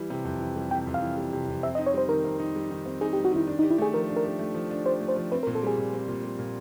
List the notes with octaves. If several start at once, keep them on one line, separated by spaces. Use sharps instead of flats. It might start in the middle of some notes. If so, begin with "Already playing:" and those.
Already playing: E3 G3
C3
F2
E3
G3
C3 G5
F2
F5
E3
G3
C3
F2
C4 E5
D#5
D#4
C#5
G3 C5
D#3 A#4
C4
D#4
G3
D#3
C4
D#4 G#4
G4
G3
F#4
D#3 E4
D4
D#4
G4
E4
A3 G#4
F3 A#4
D4
A#4
G4
A3
F3
D4
G4 C5
A3
C5
F3
C4 B4
A#4
A#2
A4
G3 G#4
A#2
C4
A#2
G3
A#2